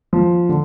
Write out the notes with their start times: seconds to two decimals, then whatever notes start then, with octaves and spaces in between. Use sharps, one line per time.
0.13 F3
0.49 D3